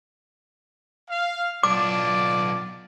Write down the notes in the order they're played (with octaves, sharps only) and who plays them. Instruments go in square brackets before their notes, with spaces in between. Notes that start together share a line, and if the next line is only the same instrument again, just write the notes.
[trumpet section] F5
[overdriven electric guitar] B1 D4 [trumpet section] F4 D5 [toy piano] D6